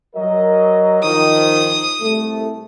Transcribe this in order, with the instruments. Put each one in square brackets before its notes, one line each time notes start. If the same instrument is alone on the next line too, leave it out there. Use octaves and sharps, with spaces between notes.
[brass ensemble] F#3 A#4 D#5
[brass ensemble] D#3 F3 [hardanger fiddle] D#6
[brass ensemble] C2 A3